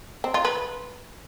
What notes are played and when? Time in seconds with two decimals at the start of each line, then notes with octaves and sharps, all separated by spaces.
0.24 C4
0.34 F4
0.45 B4